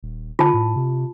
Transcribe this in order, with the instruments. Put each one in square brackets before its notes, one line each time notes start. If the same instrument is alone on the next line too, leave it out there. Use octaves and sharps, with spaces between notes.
[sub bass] D#1
[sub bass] D3 [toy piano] F4 A5
[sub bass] A2
C3